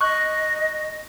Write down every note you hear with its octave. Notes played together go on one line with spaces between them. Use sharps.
D#5 C#6 F#6